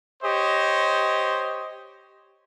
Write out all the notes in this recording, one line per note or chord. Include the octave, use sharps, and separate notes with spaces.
G4 C5 C#5 D#5